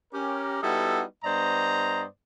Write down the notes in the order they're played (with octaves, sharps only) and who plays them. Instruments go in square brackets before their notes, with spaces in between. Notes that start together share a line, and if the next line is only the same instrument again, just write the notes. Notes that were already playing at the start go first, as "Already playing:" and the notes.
[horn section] C#4 G4 A#4
G3 B3 D#4 E4 F#4 A4
G2 B3 C5 D5 D#5 A#5